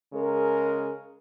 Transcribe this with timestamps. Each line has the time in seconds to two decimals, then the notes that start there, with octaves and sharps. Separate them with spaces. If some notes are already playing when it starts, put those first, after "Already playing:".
0.13 C#3 G#3 G#4 A#4